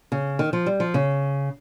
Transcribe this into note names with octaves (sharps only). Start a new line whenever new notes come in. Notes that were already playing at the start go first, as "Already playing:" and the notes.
C#3
D#3
F3
G3
F3
C#3